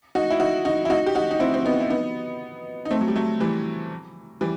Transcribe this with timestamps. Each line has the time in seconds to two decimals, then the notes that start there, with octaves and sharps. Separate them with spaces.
0.15 D#4 F#4
0.31 E4
0.40 D#4 F#4
0.65 D#4 F#4
0.85 E4
0.90 D#4 F#4
1.06 G4
1.15 D#4 F#4
1.31 D#4
1.40 C4 E4
1.54 C4
1.65 B3 D#4
1.80 E4
1.90 B3 D#4
2.85 D#4
2.91 A3 C4
3.01 F#3
3.08 G3
3.15 F#3 A3
3.40 E3 G3
4.41 E3 G3